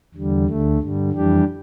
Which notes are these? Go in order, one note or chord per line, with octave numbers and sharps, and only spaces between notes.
E2 D3 G3
D2 D3 A3
G2 D3 G3
F2 E3 G3 D4 G4